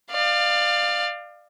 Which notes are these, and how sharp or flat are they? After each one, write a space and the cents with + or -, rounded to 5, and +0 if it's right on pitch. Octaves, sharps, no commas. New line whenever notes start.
D5 +30 F5 +0